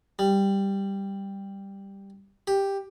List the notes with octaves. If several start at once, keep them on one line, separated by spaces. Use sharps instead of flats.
G3
G4